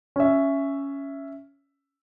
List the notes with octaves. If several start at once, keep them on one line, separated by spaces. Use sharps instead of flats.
C#4 E5